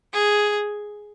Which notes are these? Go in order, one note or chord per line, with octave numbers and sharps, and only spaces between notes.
G#4